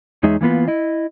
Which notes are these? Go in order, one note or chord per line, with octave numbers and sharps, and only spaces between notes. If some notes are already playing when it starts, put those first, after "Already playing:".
E2 G#3 D#4 G#4 C#5 E5
E3 A#3 B3 F4 B4
E4 D#5